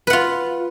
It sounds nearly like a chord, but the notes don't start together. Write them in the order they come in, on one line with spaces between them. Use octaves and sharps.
B4 F#5 F4